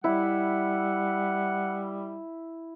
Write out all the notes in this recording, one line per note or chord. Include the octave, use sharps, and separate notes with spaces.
G3 E4 F#5